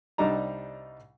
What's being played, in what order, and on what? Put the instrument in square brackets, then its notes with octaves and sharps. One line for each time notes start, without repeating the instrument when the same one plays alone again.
[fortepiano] C2 G3 D4 D#4 A#5